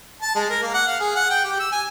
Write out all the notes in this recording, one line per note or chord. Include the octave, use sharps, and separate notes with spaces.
A5
G#3
A#4
A#3
F#5
F5
G#4
F#5
G5
G4
E6
G#5